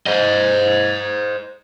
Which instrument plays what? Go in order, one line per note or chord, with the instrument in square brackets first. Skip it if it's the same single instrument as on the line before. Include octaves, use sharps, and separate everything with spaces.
[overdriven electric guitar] C5 D#5